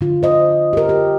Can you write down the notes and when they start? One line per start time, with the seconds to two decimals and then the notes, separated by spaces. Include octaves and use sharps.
0.01 D3 F4
0.23 C5 D#5
0.73 G4 A#4
0.89 G4